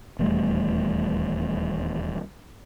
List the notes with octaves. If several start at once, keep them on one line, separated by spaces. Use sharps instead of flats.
D#1 E2 G3 A3